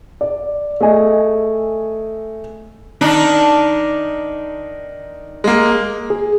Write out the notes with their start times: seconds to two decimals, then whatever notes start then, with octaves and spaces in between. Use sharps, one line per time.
0.21 D5
0.81 A3 G#4 A4 D#5 G#5
3.01 D#3 D4 D#4
5.44 G#3 A#3
6.10 G#4